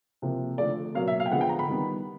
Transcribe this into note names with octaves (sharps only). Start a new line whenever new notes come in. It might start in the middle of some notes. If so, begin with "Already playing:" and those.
C3 F3 A#3
D3 F3 A3 D5
B2 F#3 A#3 F5
E5
F5
G5
D3 F3 G#3 B3 F#5
G5
A#5
B5
D#3 G3 B3